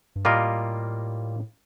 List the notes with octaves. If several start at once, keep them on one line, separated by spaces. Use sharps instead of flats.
G2
A2 G3 A#3 F4 A#4 D#5